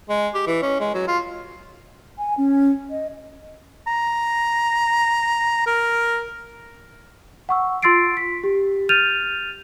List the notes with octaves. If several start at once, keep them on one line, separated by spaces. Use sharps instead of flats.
G#3
G4
E3
C#4
G#3
F#3
F4
G#5
C#4
D#5
A#5
A#4
F#5 C#6 E6
F4 C6 E6 A6 C7 D7
B6
G4
F6 G6 A6 D#7 F7